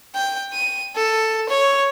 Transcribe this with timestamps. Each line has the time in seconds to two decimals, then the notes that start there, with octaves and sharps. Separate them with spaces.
0.15 G5
0.53 D#7
0.96 A4
1.49 C#5